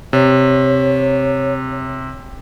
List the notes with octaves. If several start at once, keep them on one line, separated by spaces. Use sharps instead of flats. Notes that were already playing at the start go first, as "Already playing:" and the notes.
C3 C#5